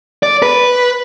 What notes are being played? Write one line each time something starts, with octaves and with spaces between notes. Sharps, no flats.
D5
B4